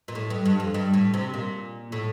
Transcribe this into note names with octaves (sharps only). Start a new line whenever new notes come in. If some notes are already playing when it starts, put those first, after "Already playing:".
A#2
A2
G2
G2
F2
G2
A2
C3
A#2
A2